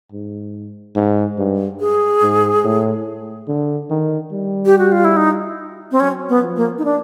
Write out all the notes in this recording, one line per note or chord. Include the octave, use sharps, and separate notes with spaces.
G#2
G#2
G2
G#4
G#2
A2
D3
D#3
G3
G4
F#4
F4
E4
D#4
C4
F#3 C#4
B3
F3
A#3
D#4
D4